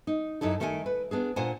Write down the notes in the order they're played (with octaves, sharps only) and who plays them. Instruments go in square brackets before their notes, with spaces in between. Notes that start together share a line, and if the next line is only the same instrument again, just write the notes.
[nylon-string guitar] D#4
F#2 D#4 E4 A4
D#3 A3 A#4 F#5 G#5
B4
B3 D4 G#4
A#2 D4 F4 C5 F#5 G#5